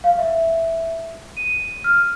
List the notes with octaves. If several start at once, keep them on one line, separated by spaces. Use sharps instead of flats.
F5
E5
D#7
F6